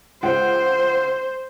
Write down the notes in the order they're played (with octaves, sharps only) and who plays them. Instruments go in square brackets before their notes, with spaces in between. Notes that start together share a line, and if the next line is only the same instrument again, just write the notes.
[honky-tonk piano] C#2 F#5 G5 [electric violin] C5